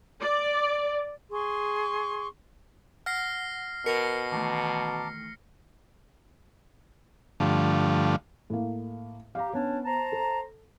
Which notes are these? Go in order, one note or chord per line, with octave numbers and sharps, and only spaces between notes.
D5
G#4 C6 C#6
F#5 F6 A#6 C7
B2 A#4 A5 A#6 C#7
D#3 E3 A3 A5 A#5 D6
G2 D3 F3 A3
A2 A#3
G4 F5 A#5
B3 C#4 D4 C#5
C5 A5 A#5
A4